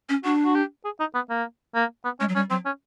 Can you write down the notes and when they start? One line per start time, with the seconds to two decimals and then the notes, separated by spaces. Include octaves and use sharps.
0.09 C#4
0.24 D4 F#4
0.45 F#4
0.55 G4
0.85 G#4
1.00 D#4
1.15 B3
1.30 A#3
1.75 A#3
2.05 B3
2.20 G#3 C#4
2.29 F#3
2.35 G3 C#4
2.50 F#3 C4
2.66 C#4